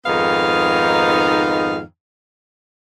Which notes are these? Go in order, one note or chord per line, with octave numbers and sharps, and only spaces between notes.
F2 G#2 D#3 B3 D#4 F5